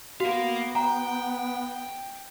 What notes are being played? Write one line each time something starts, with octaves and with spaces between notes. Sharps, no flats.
B3 F#4 A#4 F5
F#5 G5 A#5